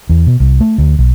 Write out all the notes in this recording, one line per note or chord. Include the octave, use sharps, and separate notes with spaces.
E2
B2
C2
A3
D2
B1